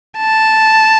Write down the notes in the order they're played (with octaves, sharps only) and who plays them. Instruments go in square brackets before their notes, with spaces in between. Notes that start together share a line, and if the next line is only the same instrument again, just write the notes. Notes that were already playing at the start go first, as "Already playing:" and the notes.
[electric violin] A5